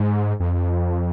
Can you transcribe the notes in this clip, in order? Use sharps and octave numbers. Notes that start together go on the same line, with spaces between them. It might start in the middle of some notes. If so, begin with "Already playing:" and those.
Already playing: G#2
F2